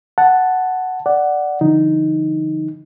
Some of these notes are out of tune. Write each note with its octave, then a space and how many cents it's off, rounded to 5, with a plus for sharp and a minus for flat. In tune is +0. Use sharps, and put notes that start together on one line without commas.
F#5 +0 A5 +0
D5 +0 F#5 +5
D3 +0 F3 -30 D#4 +0